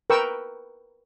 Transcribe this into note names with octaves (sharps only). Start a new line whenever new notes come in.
A#4 B4 G5 C#6 E6